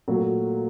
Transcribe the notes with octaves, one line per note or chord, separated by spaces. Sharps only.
A#2 F#3 A3